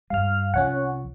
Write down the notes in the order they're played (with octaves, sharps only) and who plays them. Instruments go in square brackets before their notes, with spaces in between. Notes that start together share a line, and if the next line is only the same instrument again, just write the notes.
[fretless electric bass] G2 G3 [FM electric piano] F5 F6
[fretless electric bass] C2 F3 [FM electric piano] C#4 C#5 F#5